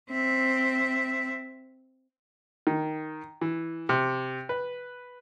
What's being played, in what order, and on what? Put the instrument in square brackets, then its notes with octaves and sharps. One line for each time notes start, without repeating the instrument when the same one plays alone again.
[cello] C4 E5
[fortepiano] D#3
E3
C3
B4